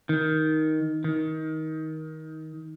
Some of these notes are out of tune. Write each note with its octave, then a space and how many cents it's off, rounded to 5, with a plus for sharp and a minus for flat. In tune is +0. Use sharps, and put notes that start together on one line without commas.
D#3 +10
D#3 +20